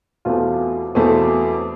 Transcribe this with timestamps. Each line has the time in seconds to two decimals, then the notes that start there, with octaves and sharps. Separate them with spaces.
0.25 E2 B2 A3 C4 F4
0.95 E2 B2 A3 C4